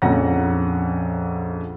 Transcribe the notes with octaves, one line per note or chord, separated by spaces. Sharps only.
A#1 F2 C#4 F#5 A#5 A#6